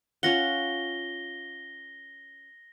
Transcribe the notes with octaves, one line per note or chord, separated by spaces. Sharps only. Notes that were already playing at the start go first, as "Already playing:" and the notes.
C#4 F4 F#5 A#6 G7